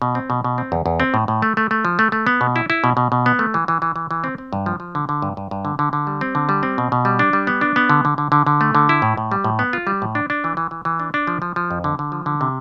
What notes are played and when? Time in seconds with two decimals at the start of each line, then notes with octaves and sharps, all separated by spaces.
0.02 B2
0.15 C4
0.30 B2
0.44 B2
0.58 C4
0.72 E2
0.86 E2
1.00 C4
1.14 A2
1.28 A2
1.42 A3
1.57 A3
1.71 A3
1.85 F3
1.99 A3
2.12 A3
2.27 B3
2.41 B2
2.56 E4
2.70 E4
2.84 B2
2.97 B2
3.12 B2
3.26 B3
3.39 A3
3.54 E3
3.68 E3
3.82 E3
3.96 E3
4.11 E3
4.24 C4
4.38 C4
4.53 G2
4.66 F3
4.80 F3
4.95 D3
5.09 D3
5.22 G2
5.37 G2
5.51 G2
5.65 D3
5.79 D3
5.93 D3
6.07 G3
6.21 C4
6.35 D3
6.49 G3
6.63 C4
6.78 B2
6.92 B2
7.05 G3
7.19 D4
7.33 G3
7.47 B3
7.61 D4
7.76 B3
7.90 D3
8.05 D3
8.18 D3
8.32 D3
8.47 D3
8.61 A3
8.75 D3
8.89 E4
9.02 A2
9.17 A2
9.32 G3
9.44 A2
9.59 B3
9.73 F4
9.87 G3
10.02 A2
10.15 D4
10.30 D4
10.44 E3
10.57 E3
10.71 E3
10.85 E3
11.00 D4
11.14 D4
11.27 F3
11.42 F3
11.56 F3
11.71 F2
11.84 D3
11.99 D3
12.12 F3
12.26 D3
12.41 C3